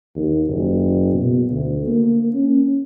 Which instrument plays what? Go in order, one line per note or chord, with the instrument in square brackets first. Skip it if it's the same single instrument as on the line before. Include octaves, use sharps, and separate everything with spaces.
[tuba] D#2
F#1
B2
D2
A#3
C#4